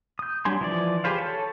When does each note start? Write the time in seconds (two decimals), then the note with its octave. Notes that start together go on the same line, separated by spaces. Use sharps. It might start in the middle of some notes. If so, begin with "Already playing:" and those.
0.19 D#6 G6
0.45 F#3 G3 D4 G#5 C6
0.61 E3 F3 D5
1.04 G4 G#4 B4 C5 F5
1.18 A4 C#5